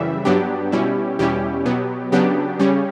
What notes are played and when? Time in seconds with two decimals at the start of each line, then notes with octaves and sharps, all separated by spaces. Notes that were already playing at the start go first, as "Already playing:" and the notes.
Already playing: F#2 C#3 E3 G3 E5
0.25 G2 F#3 B3 D4 G4
0.72 B2 G3 C#4 E4
1.19 E2 B2 G3 C#4 E4 G4
1.66 B2 F#3 B3
2.12 C#3 F#3 B3 D4 G4
2.59 C#3 G3 C#4